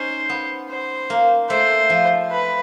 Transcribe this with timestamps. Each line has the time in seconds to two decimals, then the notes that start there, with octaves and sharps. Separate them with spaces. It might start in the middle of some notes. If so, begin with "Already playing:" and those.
Already playing: C#4 D#4 C5
0.30 B3
0.70 C5
1.10 A#3
1.50 A3 C5
1.90 F3
2.31 B4